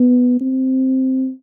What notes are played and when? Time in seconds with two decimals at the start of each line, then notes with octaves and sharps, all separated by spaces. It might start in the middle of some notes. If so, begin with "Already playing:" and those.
Already playing: B3
0.41 C4